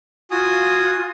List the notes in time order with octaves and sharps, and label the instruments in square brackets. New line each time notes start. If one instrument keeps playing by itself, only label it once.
[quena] F4 [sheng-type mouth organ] F#4 G#5 D#6